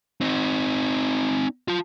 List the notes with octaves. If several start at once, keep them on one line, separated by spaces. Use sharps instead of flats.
C4 D#4
F4 A5